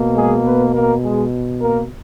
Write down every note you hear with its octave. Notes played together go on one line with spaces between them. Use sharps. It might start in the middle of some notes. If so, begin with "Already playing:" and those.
Already playing: B2 A#3
G#3 G#4
B3 B4
A#3 A#4
G#3 G#4
A#3 A#4